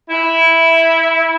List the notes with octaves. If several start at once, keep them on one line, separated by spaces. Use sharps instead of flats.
E4